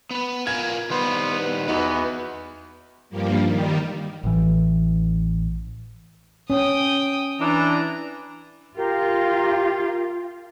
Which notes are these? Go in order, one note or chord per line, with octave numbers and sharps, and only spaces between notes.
B3 B4 B5
F4 A#4 G#5 G#6
D#3 G3 B3 C5 C6
B4
E2 B3 D#4 F#4
G2 F3 G3 A#3
D#3 G3
A1 E3
C#4 G5 D#6
E3 D4 A#5
F4 G4 A#4